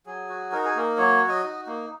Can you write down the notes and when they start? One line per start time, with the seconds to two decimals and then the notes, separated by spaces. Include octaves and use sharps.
0.06 F#3 G#4
0.29 F#4
0.52 D#4 A#4
0.65 G#4
0.75 A#3 A#4
0.98 F#3 C#5
1.21 F#4
1.29 D#5
1.43 D#4
1.67 A#3